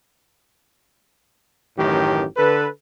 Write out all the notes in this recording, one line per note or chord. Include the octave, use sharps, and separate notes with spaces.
A1 F#2 A2 D#3 G4
D3 A4 B4